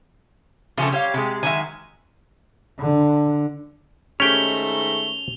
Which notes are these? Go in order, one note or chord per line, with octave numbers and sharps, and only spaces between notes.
C#3 F3 A3 C#4 G4
G3 G4 C#5 F5
C3 G#3
D#3 F#3 G#3 E5 G#5
D3
G#2 D#3 A3 C#4 G4 F7 G7